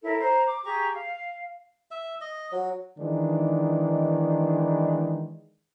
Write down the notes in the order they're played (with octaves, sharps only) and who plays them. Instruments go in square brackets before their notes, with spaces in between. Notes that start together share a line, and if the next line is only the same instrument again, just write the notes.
[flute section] E4 A4 A#4 C#5
C5 A#5
D6
G4 G#4 A#5 C#6
F5
[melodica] E5
D#5
F#3
[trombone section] D#3 E3 G#3 D4 D#4